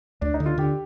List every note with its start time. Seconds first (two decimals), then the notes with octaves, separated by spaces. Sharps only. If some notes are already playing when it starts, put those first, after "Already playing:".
0.21 D2 D4
0.34 D#4
0.40 D3
0.46 F4
0.58 D3 G4